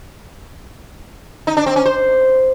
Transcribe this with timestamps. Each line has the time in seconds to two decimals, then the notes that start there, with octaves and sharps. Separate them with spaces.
1.47 D#4
1.57 D4
1.66 C4
1.76 C#4
1.85 C5